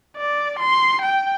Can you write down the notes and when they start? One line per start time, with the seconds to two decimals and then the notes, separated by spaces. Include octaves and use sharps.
0.17 D5
0.59 C6
1.02 G5